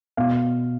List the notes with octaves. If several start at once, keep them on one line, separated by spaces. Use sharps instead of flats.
B2 F5